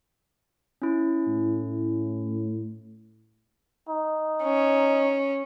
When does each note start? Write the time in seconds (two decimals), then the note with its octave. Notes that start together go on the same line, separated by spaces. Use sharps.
0.82 C#4 E4
1.28 A2
3.89 D#4
4.43 C#4